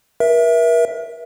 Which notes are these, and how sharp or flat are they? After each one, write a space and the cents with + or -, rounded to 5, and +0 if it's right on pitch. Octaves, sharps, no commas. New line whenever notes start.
A#4 +40 E5 +0